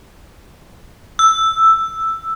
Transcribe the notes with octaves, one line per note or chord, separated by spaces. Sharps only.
E6